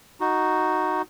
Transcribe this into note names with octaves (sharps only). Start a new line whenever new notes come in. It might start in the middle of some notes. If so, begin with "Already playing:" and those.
D#4 F#4